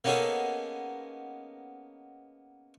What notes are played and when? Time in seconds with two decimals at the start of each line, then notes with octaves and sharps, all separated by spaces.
0.04 A#3 B3 C#4 D#4 G#4 A4